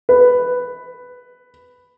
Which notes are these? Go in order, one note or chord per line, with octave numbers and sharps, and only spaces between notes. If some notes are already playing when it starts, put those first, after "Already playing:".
B4